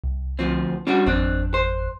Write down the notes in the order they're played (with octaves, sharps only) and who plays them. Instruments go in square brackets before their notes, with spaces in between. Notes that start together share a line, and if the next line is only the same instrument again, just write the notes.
[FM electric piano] C2
[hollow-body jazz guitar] D2 F3 C4
[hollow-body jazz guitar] G3 D4 F#4 [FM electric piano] C#4
[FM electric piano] G#1 F2 F#6 [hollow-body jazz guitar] C4 D4
[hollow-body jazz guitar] C5